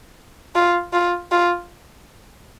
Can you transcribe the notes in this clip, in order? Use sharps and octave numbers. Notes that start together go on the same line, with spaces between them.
F4
F4
F4